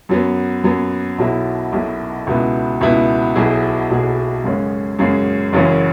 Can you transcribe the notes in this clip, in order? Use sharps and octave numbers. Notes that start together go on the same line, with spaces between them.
F#2 F#3 B3
F#2 F#3 B3
B1 B2 F#3 E4
B1 B2 F#3 E4
C#2 B2 B3 E4
C#2 B2 B3 E4
B1 B2 F#3 E4 G#4
B1 B2 F#3 E4 G#4
F#2 C#3 G#3 C#4
F#2 C#3 G#3 C#4
F#1 F#2 C#3 E3 C#4